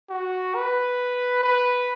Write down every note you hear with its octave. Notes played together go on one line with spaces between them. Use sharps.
F#4
B4
B4